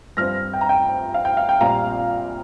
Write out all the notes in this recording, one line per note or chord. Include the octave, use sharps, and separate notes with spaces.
G2 F3 C4 F6 A#6
G5
A#5
G5
F5
G5
F5
G5
A#1 A#2 G3 C4 F5 A#5